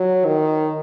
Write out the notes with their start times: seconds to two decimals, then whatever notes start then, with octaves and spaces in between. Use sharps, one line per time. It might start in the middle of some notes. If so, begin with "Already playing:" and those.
Already playing: F#3
0.26 D#3